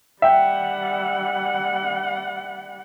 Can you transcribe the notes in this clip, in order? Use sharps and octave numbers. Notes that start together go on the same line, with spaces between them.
G3 E5 F#5 G5